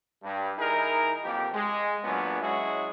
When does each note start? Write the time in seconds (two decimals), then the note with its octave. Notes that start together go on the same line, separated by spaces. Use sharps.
0.23 G2
0.58 D#3 D#4 E4 G#4 A#4
1.24 B1 F2 A#3 G4
1.54 G#3
2.04 F#2 A#2 F#3 B3 C#4 D4
2.41 F#3 G#3 C#4 E4 F#4 G#4